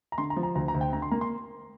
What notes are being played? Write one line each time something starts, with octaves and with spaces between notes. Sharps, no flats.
A#5
D3 C6
A#5
F3
A#5
D2 A#5
A#5
D2
G5
D3 A#5
C6
A#3 A#5
C6